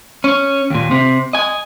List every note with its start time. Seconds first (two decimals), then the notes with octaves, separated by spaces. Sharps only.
0.24 C#4
0.70 D#2 A#2
0.91 C3
1.33 D#5 G#5